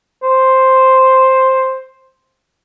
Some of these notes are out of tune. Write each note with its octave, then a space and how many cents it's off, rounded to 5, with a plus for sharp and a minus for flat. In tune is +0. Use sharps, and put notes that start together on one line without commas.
C5 +5